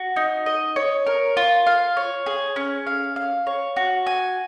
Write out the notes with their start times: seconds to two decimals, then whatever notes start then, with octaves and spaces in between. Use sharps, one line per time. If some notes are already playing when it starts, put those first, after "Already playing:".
Already playing: F#4
0.16 D#4
0.46 D#5
0.76 C#5
1.07 A#4
1.37 F4
1.67 F5
1.97 C#5
2.26 G#4
2.56 C#4
2.87 F5
3.16 F5
3.47 C#5
3.76 F#4
4.07 G#5